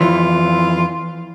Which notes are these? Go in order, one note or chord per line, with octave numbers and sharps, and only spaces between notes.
F2 E3 F4